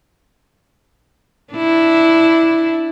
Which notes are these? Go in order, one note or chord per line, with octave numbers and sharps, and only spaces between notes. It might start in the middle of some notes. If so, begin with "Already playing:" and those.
D4 E4